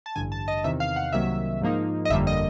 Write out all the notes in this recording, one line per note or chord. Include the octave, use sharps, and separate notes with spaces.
A5
A1 G2 D3 G#5
A5
D#5
E2 C3 D#3 E5
F5
F#5
C2 C3 D#3 F#3 A#3 E5
G#2 F3 A#3 D#4
D#5
G1 F2 D3 G3 A#3 E5
D#5